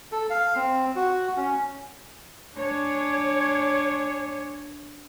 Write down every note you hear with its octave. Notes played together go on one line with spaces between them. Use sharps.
A4
F5
C4
F#4
C#4
D4 C#5 G#5